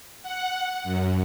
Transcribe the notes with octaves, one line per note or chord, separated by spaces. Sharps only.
F#5
F#2